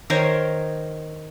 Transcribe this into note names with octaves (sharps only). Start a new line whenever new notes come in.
D#3 A#4 C5 C#5